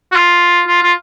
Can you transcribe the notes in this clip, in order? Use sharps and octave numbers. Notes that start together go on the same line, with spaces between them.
F#4
F4
F4
F4